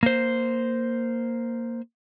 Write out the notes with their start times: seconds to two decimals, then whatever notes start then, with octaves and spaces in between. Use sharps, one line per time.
0.03 A#3 C5